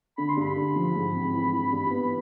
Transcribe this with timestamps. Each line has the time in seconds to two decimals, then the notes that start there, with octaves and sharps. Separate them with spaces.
0.17 D3 B5
0.29 C6
0.37 G2 B5
0.56 D3
0.75 F3
0.95 G#2
1.14 C4
1.33 E3
1.53 E3
1.72 G2
1.91 B3